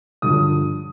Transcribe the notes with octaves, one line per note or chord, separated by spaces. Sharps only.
G2 D3 F3 D#6